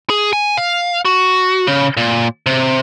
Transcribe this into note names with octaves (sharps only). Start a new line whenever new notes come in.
G#4
G#5
F5
F#4
C#3
A#2
C3